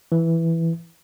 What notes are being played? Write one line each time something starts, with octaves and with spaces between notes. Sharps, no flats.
E3